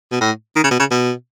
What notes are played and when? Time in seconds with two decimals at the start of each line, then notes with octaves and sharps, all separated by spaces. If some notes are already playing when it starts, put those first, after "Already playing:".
0.12 B2
0.21 A2
0.56 D#3
0.64 C#3
0.71 B2
0.79 C#3
0.91 B2